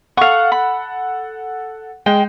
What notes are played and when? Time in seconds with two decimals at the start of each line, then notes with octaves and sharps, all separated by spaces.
0.17 A4 F5 F#5 C#6
0.52 B5
2.06 G#3 G5